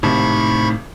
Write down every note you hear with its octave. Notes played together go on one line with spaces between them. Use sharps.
G#1 A2 C3 D#4 A5 B5 C#6